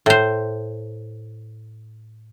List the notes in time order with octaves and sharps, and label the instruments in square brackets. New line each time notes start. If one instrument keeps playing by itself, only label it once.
[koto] A2 C5